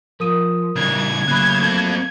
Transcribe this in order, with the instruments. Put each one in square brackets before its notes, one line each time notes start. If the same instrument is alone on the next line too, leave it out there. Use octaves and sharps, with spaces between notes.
[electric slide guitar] F3 [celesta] A#4 D#6 D#7
[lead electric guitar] C#3 E3 [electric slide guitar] G3 D4 [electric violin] G#6
[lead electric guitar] C#3 [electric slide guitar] F#3 A3 A#3 [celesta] B5 F#6
[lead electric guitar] C4 A4